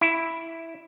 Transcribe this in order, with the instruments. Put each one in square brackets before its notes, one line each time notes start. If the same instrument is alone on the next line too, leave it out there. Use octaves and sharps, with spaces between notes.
[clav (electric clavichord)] E4